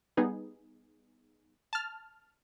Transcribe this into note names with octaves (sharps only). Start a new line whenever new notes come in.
G3 B3 D#4 G#4
A5 F6